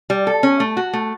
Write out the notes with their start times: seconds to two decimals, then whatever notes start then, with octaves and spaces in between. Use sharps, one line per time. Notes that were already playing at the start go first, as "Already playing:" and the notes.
0.10 G3
0.27 A4
0.43 C#4
0.60 A3
0.77 F#4
0.93 A3